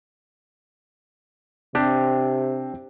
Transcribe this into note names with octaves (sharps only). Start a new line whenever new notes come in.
C3 C4 D4 G4